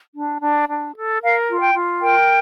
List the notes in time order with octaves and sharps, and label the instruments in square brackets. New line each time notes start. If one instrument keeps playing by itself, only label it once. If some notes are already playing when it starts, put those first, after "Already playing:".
[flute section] D4
D4
D4
A4
A#4 F5
F4
G5
F4
A#4 G5